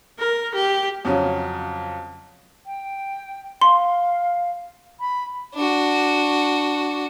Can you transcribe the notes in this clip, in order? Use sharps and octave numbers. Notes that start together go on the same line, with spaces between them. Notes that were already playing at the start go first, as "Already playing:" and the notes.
A#4
G4
F2 C#3 F#3 C#4
G5
F5 C6
B5
D4 F#4